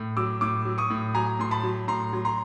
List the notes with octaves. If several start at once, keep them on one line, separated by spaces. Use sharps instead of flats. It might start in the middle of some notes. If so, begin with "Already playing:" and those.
Already playing: A2
F#3 D6 E6
A2 D6 E6
F#3
C#6 D#6
A2
F#3 G#5 A#5
A2 C6
A5 B5
F#3
A2 A#5 C6
F#3
A#5 C6